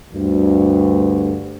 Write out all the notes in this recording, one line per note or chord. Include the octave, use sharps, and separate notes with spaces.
D2 G2